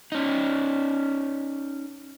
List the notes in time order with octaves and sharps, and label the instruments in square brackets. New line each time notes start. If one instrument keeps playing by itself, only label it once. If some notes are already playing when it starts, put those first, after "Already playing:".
[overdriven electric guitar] C#4 D#4